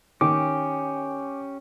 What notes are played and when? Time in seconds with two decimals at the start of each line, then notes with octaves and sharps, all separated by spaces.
0.21 D#3 C#4 G4 D6